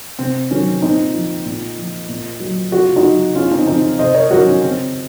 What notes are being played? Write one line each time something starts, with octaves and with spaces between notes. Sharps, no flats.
C3 C4
D#3 F#3 C#4
A#2 C4 D#4
F3
A#2
F3
A#2
F#3
C#3 F#4
F4
D#4 F#4
F#3
C#3 C#4 F4
C4 D#4
F3 C4 D#4
C3 C5 D#5
A#4 C#5
D#3 F#3 F#4 A#4
C#4
C#3 C4